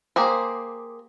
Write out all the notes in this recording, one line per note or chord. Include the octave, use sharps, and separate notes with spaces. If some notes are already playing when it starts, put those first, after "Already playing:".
A#3 G4 G#4 C5